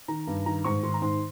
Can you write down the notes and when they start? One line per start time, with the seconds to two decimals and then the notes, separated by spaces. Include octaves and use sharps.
0.08 D#3 A#5
0.27 G2
0.46 D#3 A#5
0.64 G#2 C#6
0.83 D#3 C6
0.94 A#5
1.02 G#2 C6